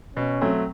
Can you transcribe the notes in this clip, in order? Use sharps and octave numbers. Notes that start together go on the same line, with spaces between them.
B2 C#4
F#3 A3 C4